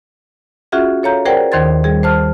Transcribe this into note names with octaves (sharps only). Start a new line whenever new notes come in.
C#4 F4 F#4 G#4 E5 F#5
A4 C#5 F5 A#5 G6
G#4 A#4 C5 D5 F#5 G5
D#2 D#3 C5 C6 G#6 A6
G3 G#4
C5 A5 F6